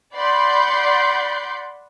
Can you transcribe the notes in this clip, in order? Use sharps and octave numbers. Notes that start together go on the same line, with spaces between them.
D5 F#5 B5 C6 G6 C7